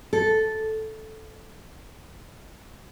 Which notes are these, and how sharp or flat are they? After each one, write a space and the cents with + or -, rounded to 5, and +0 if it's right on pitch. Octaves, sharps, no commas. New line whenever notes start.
A4 -10